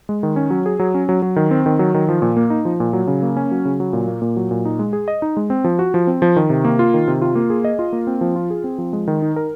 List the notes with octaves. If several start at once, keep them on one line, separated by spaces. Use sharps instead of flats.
G#3
D#3
C#4
F#3
G#4
F#3
C#4
F#3
F#3
D#3
C4
D#3
F#3
D#3
F3
A#2
A#3
D#4
F3
A#2
F#3
C#3
A#3
C#4
F#3
C#3
F#3
A#2
A#3
A#2
F#3
A#2
D#4
G#3
G#4
D#5
D#4
G#3
C4
F3
F#4
F3
C4
F3
D#3
C3
A#3
F4
D#3
C3
F4
A#3
G#4
D#5
F4
A#3
C4
F3
F4
G#4
C4
F3
G#3
D#3
D#4
A#4